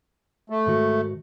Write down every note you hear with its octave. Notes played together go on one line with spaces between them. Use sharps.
A3
G#2 D#3 F#4